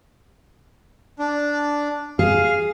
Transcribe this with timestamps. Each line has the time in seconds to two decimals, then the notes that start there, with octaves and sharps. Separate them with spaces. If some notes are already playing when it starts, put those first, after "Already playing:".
1.19 D4
2.19 G#4 F5